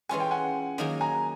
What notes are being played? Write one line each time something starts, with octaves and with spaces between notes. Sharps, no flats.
E3 G#3 C#4 F4 A4 G#5
G5
F#5 G#5
D#3 F#3 A#3 D#4 G#4
G#5 A#5